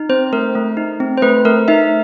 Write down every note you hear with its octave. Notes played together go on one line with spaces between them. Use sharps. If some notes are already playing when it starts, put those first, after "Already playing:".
Already playing: D#4
C4 C5
A3 A#4
A3
D#4
C4
C5
A3 B4
A3 A#4
D#4 E5